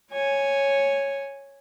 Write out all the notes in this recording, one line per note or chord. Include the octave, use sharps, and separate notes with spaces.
C#5 G#5